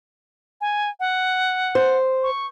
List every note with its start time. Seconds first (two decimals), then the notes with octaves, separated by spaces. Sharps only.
0.61 G#5
1.00 F#5
1.75 C5
2.23 C#6